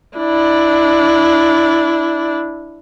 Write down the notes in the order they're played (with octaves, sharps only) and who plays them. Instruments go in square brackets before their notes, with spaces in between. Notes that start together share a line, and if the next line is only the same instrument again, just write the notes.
[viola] D4 E4